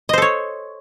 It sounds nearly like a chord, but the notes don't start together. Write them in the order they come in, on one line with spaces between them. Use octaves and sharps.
D#5 C5 A4 C#5